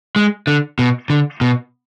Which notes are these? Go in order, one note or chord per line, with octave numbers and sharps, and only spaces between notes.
G#3
D3
B2
D3
B2